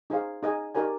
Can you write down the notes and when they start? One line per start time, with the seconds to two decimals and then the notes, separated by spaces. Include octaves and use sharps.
0.10 D#4 G#4 C5 F5
0.43 D#4 G#4 D#5 G#5
0.75 D#4 G4 A#4 D5 G#5